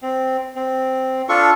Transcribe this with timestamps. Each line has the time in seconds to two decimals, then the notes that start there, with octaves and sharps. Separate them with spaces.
0.03 C4
0.56 C4
1.29 D4 F4 A4 C#6